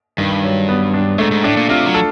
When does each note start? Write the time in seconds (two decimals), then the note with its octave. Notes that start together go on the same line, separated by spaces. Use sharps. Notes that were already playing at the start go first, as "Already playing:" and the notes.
0.18 G2 D#3
0.43 F#3
0.69 B3
0.94 D4
1.18 G#2 A3
1.31 G#2
1.44 A2 D4
1.57 A#2
1.69 C3 F4
1.86 F#3
1.94 A4